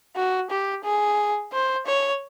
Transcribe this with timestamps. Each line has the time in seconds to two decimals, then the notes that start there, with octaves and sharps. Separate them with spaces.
0.16 F#4
0.50 G4
0.84 G#4
1.52 C5
1.86 C#5